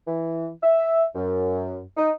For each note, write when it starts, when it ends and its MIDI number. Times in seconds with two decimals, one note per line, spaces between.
0.07 0.48 52
0.63 1.04 76
1.15 1.80 42
1.97 2.09 63